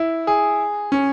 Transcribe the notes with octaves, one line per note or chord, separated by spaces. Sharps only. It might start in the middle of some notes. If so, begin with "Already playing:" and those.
Already playing: E4
G#4
C#4